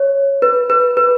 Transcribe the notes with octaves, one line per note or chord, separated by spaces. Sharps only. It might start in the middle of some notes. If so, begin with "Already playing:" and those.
Already playing: C#5
B4
B4
B4